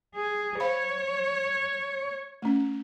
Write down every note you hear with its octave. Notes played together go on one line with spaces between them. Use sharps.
G#4
C5 C#5 F5 B5
A3 C#4